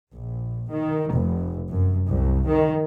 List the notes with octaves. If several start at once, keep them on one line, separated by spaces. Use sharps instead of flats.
A#1
D#3
F1
F#2
C2
D#3